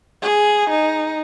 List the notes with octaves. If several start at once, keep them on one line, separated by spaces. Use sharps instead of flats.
G#4
D#4